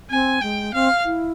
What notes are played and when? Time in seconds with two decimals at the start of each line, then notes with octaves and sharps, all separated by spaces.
0.10 C4 G#5
0.41 G#3 G5
0.74 C4 F5
1.05 E4